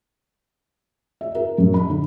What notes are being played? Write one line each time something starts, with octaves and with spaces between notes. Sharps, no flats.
E5
A#4
F#2
B5
D3